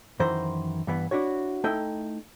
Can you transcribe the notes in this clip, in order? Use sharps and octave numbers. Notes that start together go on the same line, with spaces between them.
F#2 D#3 E3 C5 A#5
G2 E3 B3
D4 E4 F#4 C#5
A3 D#4 E4 G5